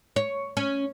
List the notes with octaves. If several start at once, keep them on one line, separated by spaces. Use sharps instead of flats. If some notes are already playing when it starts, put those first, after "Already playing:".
C#5
C#4